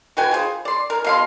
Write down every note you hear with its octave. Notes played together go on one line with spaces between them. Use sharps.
F#4 B4 G5 G#5
F4 G#4 C5
D5 C6
A#4
B2 F5 C6